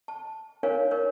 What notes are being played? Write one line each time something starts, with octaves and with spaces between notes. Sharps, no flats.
A5
D4 D#4 A#4 C#5 F5 G#5
D#4 A#4 C#5